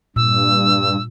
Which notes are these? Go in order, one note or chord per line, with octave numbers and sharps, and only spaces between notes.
G2 A#2 E6